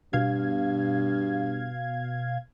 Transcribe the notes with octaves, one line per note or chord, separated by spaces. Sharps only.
G2 B2 F5 G#6